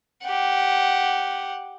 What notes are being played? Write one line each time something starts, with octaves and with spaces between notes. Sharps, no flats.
G4 F#5